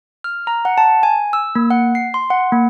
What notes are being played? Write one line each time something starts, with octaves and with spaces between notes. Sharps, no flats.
F6
A#5
F#5
A5
G#5
E6
A#3
F#5
C7
C6
F#5
A#3